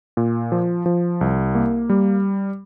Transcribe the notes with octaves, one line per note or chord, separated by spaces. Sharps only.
A#2
F3
F3
C2
A#3
G3